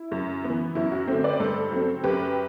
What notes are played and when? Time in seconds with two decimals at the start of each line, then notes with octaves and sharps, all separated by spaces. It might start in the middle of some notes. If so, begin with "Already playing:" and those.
Already playing: E4
0.12 F#2
0.44 E3 B3
0.75 F#2 E4
0.92 F#4
1.08 D3 A3 C4
1.24 B4 D5
1.40 G2 A4 C5
1.72 F#3 C4
2.04 F#2 G4 B4